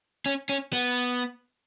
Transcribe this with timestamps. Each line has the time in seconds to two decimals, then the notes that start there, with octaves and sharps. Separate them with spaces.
0.26 C#4
0.49 C#4
0.73 B3